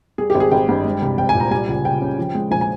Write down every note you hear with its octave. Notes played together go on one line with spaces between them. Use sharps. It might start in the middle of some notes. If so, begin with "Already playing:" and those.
G3 G#4
G4
G#1
G#4
G#1 G5
G2
G#3
C2
C2 G5
G#5
A#2
A#5
G3 G#5
C#2
C#2 G5
C#3
F3
G#3
A#1 G#5
G#5